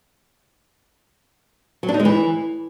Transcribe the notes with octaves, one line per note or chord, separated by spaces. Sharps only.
F#3
D4
D#4
G#3
E3